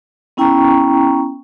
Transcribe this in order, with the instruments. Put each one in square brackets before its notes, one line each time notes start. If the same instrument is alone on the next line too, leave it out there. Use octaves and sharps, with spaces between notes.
[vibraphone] B3 C#4 E4 G5 A#5 C#6